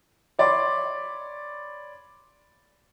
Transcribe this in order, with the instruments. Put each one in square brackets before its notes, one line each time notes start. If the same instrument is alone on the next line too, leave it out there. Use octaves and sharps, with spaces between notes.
[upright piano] C#5 D5 B5 C6 D6